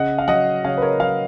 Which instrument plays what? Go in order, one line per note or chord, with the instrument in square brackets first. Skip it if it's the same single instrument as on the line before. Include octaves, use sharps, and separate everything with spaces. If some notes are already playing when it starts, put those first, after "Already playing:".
Already playing: [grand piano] C#3 D#5 F#5
F5
F#3 D#5 F#5
C#3 C#5 F5
B4
A#4 C#5
F#3 C#5 F5